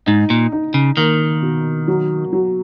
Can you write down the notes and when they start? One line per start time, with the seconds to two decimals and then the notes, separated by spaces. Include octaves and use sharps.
0.06 G#2 D#4
0.30 A#2
0.52 D#4
0.74 C#3
0.97 D#3 A#3
1.42 B2
1.88 F#3
2.33 F#3